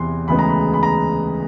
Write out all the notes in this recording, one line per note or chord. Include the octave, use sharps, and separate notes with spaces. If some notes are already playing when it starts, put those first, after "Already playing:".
Already playing: E2 C3 E3 C6
D2 C#3 E3 G#3 B3 B5
A#5
B5
B5
A#5